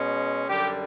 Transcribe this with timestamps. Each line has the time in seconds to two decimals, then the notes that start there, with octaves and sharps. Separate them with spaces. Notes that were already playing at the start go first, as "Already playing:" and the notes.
Already playing: B2 G#3 C#4
0.48 F#2 D3 G3 G4